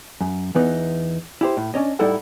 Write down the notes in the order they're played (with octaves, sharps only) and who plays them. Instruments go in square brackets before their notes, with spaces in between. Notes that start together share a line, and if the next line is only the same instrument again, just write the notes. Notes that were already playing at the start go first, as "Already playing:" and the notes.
[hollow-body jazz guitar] F#2
E2 E3 B3 D#4
E4 G4 C5
A2
C#4 D4 C#5 D#5
A2 G3 D#4 E4 A4 F#5